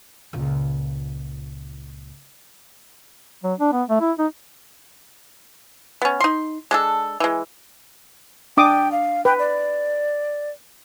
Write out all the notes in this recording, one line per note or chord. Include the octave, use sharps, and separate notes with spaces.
C#2 A#2
F#3
D4
B3
A3
E4
D#4
B3 C#4
D#4 C6
G#3 D4 A4
E3 G#3
D4 G5 D6 D#6
F5
B4 G5
D5